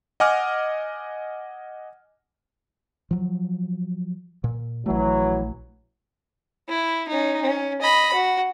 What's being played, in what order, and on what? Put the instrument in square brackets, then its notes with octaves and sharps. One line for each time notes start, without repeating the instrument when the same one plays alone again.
[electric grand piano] D#5 F#5 G#5 D6 F6
[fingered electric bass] F3 F#3
A#2
[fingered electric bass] A#1 A3 [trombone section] E3 F#3
[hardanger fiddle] E4
C#4 D#4
C#4
D#5 B5
F#4